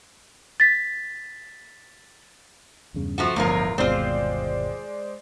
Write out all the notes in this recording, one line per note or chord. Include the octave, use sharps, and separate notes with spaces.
A6 B6
E2 G2 C#3
F3 A3 F#4
D1 G1 E2 F3 A3 F4 A#4 A#5
G1 D#2 B2 G#3 C4 F4 C5 D5